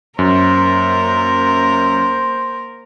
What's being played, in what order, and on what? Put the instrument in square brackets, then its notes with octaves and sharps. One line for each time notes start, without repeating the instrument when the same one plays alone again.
[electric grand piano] F#2 [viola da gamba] A#3 A#4 [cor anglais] C5